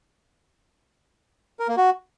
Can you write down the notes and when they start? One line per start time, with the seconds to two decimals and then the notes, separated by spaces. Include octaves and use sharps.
1.59 A#4
1.68 A#3
1.77 F#4